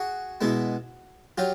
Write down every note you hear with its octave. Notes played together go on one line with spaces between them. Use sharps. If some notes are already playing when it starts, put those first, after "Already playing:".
Already playing: F#4 G#4
B2 G#3 B3 E4
F#3 F4 G4